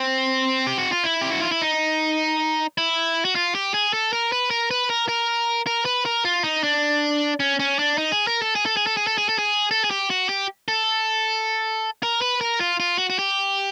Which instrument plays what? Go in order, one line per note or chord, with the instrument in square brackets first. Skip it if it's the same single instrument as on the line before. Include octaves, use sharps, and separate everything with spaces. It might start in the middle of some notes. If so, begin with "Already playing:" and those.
Already playing: [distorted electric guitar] C4
G4
F#4
F4
E4
G4
F#4
F4
E4
D#4
E4
F#4
F4
G4
G#4
A4
A#4
B4
A#4
B4
A#4
A#4
A#4
B4
A#4
F4
D#4
D4
C#4
C#4
D4
D#4
G#4
A#4
A4
G#4
A4
G#4
A4
G#4
A4
G#4
A4
G#4
A4
G#4
G4
F#4
G4
A4
A#4
B4
A#4
F4
F4
F#4
F#4
G4